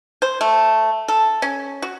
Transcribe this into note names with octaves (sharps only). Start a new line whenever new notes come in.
C5
A3
A4
C#4
F#4